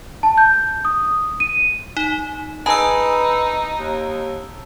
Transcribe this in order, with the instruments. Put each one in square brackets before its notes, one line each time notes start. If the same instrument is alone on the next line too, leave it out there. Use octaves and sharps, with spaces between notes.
[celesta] A5
G6
D#6
D#7
[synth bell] D#4
[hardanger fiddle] D#4 [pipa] G#4 [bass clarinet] B4 [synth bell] A5 E6
[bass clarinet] D#2